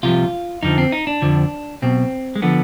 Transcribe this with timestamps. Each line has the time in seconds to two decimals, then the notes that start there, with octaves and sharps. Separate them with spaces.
0.03 C2 C3 F3 F4
0.63 F2 D3 F3 D#4
0.78 C4
0.92 D#4
1.07 D4
1.22 F2 D3 F3
1.82 B1 B2 C4
2.36 G#3
2.42 D3 F3 B3